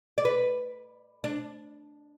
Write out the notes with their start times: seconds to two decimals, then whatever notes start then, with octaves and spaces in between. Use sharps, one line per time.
0.18 D5
0.25 B4
1.24 D4